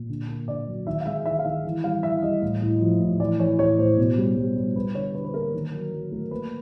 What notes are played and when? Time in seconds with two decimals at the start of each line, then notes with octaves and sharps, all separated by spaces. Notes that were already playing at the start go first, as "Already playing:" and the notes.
Already playing: A#2
0.09 D3
0.28 A#3
0.48 D3 D5
0.67 F#3
0.87 D#3 E5
1.00 F5
1.06 G#3 E5
1.26 D#3 E5
1.39 F5
1.45 D#3 E5
1.65 E3
1.84 G3 F5
2.03 E3 E5
2.22 G3 D#5
2.42 A2
2.62 A2
2.81 F3
3.01 A2
3.20 E3 D5
3.40 E3 C#5
3.59 A2 C#5
3.79 A2 C5
3.97 B2
4.17 G3
4.36 G3
4.56 G3
4.76 G3 B4
4.95 D3 C#5
5.14 D3 B4
5.25 B4
5.33 A#3 A#4
5.54 D#3
5.73 F#3
5.93 F#3
6.12 A3
6.31 A#3 B4